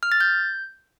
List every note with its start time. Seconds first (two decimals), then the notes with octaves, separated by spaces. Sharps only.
0.03 F6
0.12 A6
0.21 G6